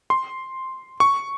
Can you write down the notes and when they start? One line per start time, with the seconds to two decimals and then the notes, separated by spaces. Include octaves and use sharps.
0.10 C6
1.00 C#6